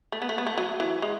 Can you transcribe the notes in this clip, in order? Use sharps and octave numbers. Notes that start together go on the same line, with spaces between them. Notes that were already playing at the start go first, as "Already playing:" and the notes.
A3
B3
A3
B3
A3
F#3
E3
G#3